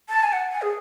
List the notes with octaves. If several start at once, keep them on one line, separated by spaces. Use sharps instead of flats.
A5
G#5
F#5
G#5
G#4